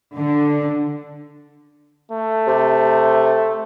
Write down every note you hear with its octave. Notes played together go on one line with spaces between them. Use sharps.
D3
A3
C3